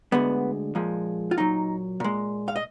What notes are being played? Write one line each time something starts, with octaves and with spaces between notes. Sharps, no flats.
D2 D3 G#3 B3
A#2 F3 G#3
F4
A#2 F#3 D#4
A#2 G#3
F5
D#5